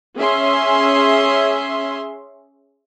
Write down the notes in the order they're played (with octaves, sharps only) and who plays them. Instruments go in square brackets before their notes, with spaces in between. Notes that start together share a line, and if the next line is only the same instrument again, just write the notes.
[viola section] C#4 G#4 E5 C6